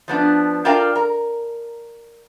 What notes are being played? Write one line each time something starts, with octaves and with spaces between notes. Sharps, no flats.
F3 B3 D4
D4 F4 A#4 D5 F5 G5
A#4